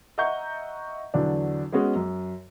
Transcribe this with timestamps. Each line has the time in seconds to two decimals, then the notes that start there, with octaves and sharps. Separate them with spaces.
0.18 D#5 E5 F#5 A#5 C#6 G6
1.14 E2 D3 F#3 D4
1.72 G#3 B3 C#4 F#4 G#4
1.95 F#2